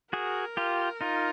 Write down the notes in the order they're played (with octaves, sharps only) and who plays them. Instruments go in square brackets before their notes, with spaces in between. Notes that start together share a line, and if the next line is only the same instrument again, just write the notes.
[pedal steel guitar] F#4 G#4 [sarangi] A#4
[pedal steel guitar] F4 G4
D#4 F4